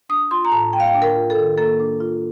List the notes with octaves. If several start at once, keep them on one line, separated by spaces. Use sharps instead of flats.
D4 D#6
F4 C6
A#5
A2 A5
A#3 G5
F5
G5
D4
A#4
F4
A4
D#3
A#3 A4
D4
F4